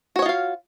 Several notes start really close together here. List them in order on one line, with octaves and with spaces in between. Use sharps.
F#4 C#5 D#5 F4 F5